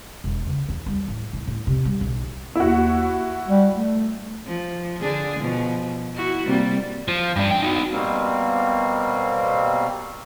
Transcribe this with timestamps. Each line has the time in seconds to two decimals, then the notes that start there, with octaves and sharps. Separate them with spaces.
0.24 E1
0.46 C#2
0.69 E2
0.86 G3
1.08 A2
1.33 A2
1.47 A2
1.67 C3
1.85 G3
2.01 B1
2.55 D#2 E4 F#4
3.48 G3
3.74 A3
4.46 F3
5.00 D3 D4 G#4
5.39 B2 F3
6.15 E4 F#4
6.46 C3 G3 A#3
7.08 F3
7.36 G2 D4
7.51 C#4 G5
7.62 D#4 F#4
7.90 B2 G3 A#3 C4